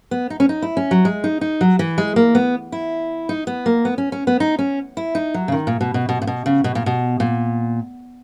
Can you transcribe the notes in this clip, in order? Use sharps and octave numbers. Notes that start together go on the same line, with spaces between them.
B3
D#4
C#4
D#4
E4
C#4
F#3
G#3
D#4
D#4
F#3
E3
G#3
A#3
B3
E4
D#4
B3
A#3
B3
C#4
C#4
B3
D#4
C#4
E4
D#4
F#3
C#3
D#3
A#2
B2
B2
B2
A#2
B2
C#3
B2
A#2
B2
A#2